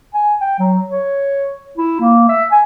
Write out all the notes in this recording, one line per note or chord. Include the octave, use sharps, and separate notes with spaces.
G#5
G5
F#3
C#5
E4
A#3
E5
G#5